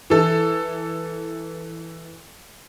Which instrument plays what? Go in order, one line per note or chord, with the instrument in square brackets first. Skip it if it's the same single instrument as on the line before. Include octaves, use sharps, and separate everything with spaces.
[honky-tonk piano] E3 A4